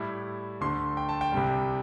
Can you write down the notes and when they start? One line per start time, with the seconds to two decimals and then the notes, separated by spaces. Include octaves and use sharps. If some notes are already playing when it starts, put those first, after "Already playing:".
Already playing: A2 G3 E4
0.61 D2 D3 A3 C6
0.97 G5
1.09 A5
1.21 G5
1.32 C2 C3 G3